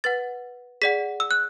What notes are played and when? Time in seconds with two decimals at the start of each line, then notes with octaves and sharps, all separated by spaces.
0.04 B4 F#5 A6
0.82 G#4 D5 F#5 B6
1.20 E6
1.31 F#6